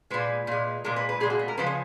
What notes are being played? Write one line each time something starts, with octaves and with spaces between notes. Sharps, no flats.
A#2 G#3 B4
A#2 G#3
A#2 G#3 A#4
B4
B4
A#2 G#3 G#4
F#4
B3
A#4
C#3 F3 G#3 B4
C#5